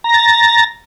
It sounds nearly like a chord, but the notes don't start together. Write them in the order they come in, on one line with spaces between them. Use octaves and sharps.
A#5 A#6 A6